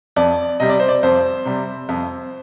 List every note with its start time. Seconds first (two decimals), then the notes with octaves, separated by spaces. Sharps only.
0.16 F2 D5
0.60 C3 G3 D#5
0.69 D5
0.79 C5
0.89 D5
1.03 F2 C5
1.45 C3 G3
1.89 F2